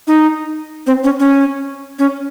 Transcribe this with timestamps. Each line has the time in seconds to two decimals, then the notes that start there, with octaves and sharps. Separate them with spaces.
0.07 D#4
0.87 C4
1.04 C#4
1.20 C#4
1.99 C#4